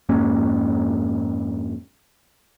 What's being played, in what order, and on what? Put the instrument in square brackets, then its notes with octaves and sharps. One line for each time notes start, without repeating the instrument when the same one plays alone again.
[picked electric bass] F2 G#2 A#3 C#4